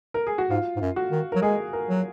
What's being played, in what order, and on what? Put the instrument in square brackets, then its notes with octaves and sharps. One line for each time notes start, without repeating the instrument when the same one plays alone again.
[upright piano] A#4
G#4
F#4
[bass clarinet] G#2 [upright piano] F4
[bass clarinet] G#2
F#2
[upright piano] F#4
[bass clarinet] D#3
[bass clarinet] F#3 [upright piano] A#4
[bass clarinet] G#3 [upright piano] G#4
[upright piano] A#4
[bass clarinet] F#3